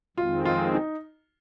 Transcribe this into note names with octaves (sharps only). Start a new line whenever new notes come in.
F2 D#3 G#3 C4 F4
F4
D#4